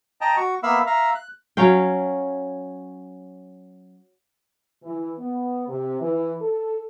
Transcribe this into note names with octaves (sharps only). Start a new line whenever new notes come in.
D#5 G5 A5 A#5
F#4 C#6
A#3 B3 E5 F5 B5 E6
E5 F5 A#5
F#6
F#3 C#4 F5 G5
E3
B3
C3
E3
A4